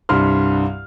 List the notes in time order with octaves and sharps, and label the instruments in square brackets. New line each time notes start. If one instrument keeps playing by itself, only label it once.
[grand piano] C2 G2 C6 F6